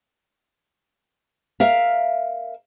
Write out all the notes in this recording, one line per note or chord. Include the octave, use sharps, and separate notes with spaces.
A#4 E5 F5